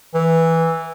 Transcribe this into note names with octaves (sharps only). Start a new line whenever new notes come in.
E3